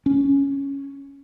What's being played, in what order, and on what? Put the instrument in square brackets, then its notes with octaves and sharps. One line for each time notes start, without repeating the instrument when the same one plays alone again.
[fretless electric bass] C#4